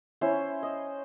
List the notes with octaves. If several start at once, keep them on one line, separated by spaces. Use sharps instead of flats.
C#4 E4 C5 C#5
D#5